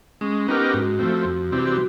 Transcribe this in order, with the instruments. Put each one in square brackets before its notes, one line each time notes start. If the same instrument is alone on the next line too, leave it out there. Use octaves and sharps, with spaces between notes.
[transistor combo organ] G#3 [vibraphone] C#4
[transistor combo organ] B3 D#4 G4 A#4
[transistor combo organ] G#2 [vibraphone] F#4
[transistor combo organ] F3 A3 C4
F2
C3 E3 G3 C4
[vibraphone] F#4